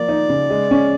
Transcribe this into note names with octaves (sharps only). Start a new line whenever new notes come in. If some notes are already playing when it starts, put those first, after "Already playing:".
Already playing: F3 A#3 D5
D#4
C#3
G#3
C#4